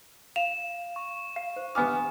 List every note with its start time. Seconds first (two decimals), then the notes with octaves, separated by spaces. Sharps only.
0.36 F5 E7 F7
0.96 C#6
1.36 F5
1.56 C5
1.75 B3 G#5 D6 F6